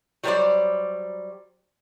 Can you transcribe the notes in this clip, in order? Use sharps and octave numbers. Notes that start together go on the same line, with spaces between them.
F#3 G3 G4 A#4 C5 D5